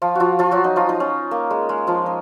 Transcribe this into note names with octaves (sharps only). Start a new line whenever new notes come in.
F3 F4
F3 F4 F#4
F3 F4
F#3 F#4
D#4
F3 F4
D#4
C#4
A#3
G#3
G#3
F3 F4
D#4